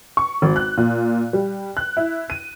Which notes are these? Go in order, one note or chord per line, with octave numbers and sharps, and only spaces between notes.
C#6
G#1
F#6
A#2
G3
F#6
E4
D#7